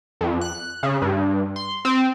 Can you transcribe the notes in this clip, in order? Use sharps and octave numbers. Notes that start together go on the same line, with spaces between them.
F2
F#6
C#3
G2
C6
C4